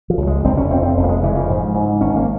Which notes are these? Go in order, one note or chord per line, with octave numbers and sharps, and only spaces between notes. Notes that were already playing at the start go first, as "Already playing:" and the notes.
F3
C#2
G#3
F1 C4
C#4
F2 C4
C4
F1
A#3
G#3
C#3 E3
F3
G#2
G#2
G#1 C#4
A#3